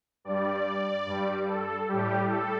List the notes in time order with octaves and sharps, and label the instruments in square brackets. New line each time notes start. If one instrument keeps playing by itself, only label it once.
[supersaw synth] G2 G3 D5
G2 G3
A4
A2 G3 G4
A4